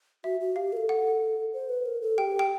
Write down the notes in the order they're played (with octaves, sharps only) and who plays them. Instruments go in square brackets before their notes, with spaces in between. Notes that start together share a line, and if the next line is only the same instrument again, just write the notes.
[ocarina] F#4 [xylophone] E5
[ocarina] F#4
[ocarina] G4 [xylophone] F5
[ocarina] A#4
A4
[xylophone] F#5
[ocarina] C5
B4
A#4
A4
[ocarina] G4 [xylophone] G5
[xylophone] G5